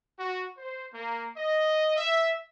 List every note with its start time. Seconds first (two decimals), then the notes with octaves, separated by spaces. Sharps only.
0.18 F#4
0.57 C5
0.93 A#3
1.35 D#5
1.96 E5